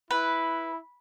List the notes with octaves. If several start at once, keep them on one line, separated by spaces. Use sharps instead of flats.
E4 B4